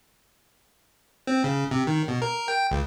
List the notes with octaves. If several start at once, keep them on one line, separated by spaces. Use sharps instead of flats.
C4
C#3
C3
D#3
B2
A#4
G5
C#2